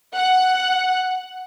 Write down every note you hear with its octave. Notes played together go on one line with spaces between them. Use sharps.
F#5